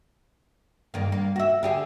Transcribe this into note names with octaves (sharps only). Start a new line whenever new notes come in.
G2 D#3 A#3
A#3
F#4 E5
D3 G4 G#4